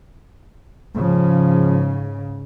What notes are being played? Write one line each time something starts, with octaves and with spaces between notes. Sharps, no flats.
G#2 C#3 F3